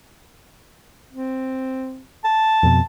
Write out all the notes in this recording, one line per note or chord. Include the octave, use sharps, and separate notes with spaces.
C4
A5
F2 B2